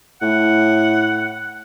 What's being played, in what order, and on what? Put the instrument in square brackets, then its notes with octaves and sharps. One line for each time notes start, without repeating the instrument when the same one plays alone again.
[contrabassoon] A2 [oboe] F#5